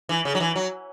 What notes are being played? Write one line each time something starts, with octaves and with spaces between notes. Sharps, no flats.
E3
C#3
F#3
E3
F#3